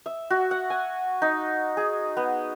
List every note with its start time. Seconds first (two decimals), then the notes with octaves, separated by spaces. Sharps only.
0.06 E5
0.31 F#4
0.51 F#5
0.70 G#5
1.22 D#4
1.77 G#4
2.17 B3